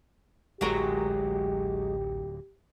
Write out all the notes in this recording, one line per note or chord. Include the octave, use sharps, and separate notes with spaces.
D1 A1 A#2 F#3 G#3 G4 A#4